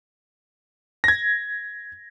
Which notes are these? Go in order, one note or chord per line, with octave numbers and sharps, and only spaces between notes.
G#6 A#6